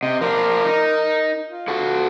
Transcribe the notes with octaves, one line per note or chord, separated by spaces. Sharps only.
C3 D#5
F3 D4 A#4
D#4
F4
F#4 A4